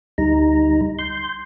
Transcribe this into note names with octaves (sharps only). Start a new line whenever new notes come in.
D2 G3 D#4 A#5
C6 G6